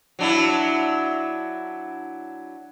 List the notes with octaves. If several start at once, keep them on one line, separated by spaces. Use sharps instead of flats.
F#3 D4 E4